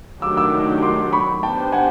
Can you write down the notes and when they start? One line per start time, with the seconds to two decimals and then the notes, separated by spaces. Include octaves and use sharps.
0.22 D#3 F#3 A3 D4 G4 D6 E6
0.37 D6 E6
0.82 C6 D6
1.13 B5 C#6
1.43 B3 D4 G4 C5 G5 A5
1.72 F#5 G#5